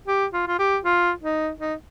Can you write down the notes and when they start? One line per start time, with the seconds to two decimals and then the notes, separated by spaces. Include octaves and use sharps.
0.08 G4
0.34 F4
0.47 F4
0.59 G4
0.84 F4
1.23 D#4
1.60 D#4